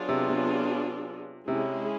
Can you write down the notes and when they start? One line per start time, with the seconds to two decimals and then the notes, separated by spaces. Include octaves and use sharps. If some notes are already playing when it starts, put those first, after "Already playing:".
Already playing: F#3 B3 D4 F4 G#4
0.09 C3
0.29 C3
1.48 C3 G#3 C#4 E4 G#4